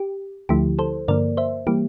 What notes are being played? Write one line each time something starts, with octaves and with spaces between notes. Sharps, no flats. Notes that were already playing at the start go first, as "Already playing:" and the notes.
Already playing: G4
D2 D3 F3 A3 E4 G4
A4 C5
G2 D3 F3 A#3 A#4 D5
C5 E5
E3 G3 A#3 G4